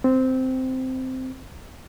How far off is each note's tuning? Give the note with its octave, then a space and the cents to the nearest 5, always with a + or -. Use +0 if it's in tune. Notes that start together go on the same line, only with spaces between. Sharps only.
C4 -10